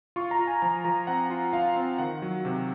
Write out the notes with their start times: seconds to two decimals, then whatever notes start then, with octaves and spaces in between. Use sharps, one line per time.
0.16 F4 C#6
0.31 A#5
0.39 F4
0.47 G#5
0.62 F3 A#5
0.85 F3 A#5
1.07 C4 F#5
1.30 F4
1.53 F4 F5
1.76 C4
1.98 D#3 F#5
2.22 F#3
2.45 C3